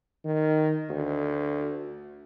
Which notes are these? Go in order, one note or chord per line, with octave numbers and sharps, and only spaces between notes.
D#3
D2